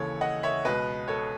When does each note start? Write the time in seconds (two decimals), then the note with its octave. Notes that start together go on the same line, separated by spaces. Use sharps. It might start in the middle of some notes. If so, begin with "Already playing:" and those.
Already playing: D#2 C#3 E3 A4 C#5
0.21 D#5 F#5
0.43 C#5 E5
0.65 C#2 B2 B4 D#5
1.08 A4 C#5